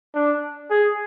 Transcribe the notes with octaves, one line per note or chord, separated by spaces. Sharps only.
D4
G#4